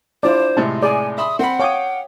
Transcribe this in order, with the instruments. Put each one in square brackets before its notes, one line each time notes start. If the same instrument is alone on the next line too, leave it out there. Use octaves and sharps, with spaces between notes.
[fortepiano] D4 [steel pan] E4 F4 D5 [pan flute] C5
[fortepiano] A2 C3 G#3 [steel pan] A5
[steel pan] G#4 D5 [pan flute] G#5
[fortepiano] E5 B5 C6 [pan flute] D#6
[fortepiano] C4 B5 [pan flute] F#5
[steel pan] C#5 D#6 [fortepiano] F5 G5 D6